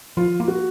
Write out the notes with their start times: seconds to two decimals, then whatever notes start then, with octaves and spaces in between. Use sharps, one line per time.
0.17 F3 F4
0.40 A#3 F4
0.48 F#4